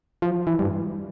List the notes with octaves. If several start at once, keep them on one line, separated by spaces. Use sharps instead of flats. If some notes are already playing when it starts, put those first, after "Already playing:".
F3
E3
G2